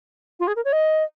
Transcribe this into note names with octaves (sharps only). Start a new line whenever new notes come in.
F4
G#4
A#4
C#5
D#5